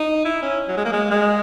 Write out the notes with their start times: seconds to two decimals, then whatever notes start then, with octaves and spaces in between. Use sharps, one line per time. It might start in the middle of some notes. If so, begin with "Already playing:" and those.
Already playing: D#4
0.25 E4
0.43 C#4
0.68 F#3
0.77 G#3
0.85 A#3
0.93 G#3
1.11 G#3